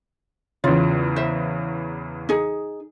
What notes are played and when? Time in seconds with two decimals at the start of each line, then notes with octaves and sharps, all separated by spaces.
0.64 E2 C#3 F4
1.16 C5 E5
2.29 D#4 G#4